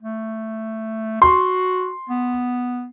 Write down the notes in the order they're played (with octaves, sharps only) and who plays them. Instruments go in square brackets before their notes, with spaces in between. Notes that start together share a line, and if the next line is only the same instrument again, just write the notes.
[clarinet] A3
[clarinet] F#4 [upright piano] C6
[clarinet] B3